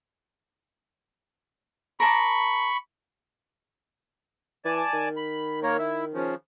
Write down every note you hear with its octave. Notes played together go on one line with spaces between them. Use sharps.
A#4 A5 B5 C#6 D6
E3 D5 G#5 A5
D#3
B5
A#3 A#4 C#5
E4
C#3 F3